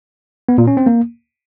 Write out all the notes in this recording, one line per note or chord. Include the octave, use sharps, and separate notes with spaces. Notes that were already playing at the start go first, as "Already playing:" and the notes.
B3
A#2
C#4
C4
A#3